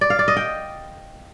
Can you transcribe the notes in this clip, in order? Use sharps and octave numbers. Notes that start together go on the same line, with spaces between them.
D5
F5
D5
D#5
G5